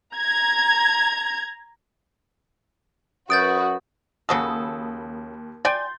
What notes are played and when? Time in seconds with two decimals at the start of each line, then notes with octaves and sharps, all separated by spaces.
0.15 A#5 G#6
3.30 F#2 F#4 B4 D#6 G6 A6 D7
4.29 D#2 C#3 F#3 A4 B5 D#6
5.65 D5 G5 G#5 C6 G6 A6